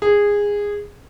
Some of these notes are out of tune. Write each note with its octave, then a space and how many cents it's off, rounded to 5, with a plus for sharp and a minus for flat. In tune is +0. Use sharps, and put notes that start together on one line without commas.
G#4 -15